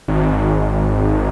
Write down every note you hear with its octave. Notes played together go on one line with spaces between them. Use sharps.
G#1